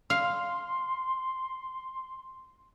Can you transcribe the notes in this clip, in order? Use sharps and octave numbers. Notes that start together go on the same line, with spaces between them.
F5 C6